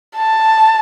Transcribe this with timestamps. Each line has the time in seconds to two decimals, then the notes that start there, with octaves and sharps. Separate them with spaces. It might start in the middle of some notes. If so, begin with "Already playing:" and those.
0.16 A5